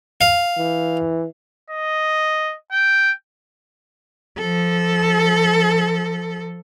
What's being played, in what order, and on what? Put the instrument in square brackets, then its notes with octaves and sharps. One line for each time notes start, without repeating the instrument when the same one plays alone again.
[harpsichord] F5
[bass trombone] E3
[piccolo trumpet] D#5
G5
[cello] F3 A4